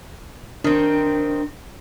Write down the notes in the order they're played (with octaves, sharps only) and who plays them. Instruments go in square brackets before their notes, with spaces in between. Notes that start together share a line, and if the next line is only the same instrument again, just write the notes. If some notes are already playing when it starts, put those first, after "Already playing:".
[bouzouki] D#3 C4 [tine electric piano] D4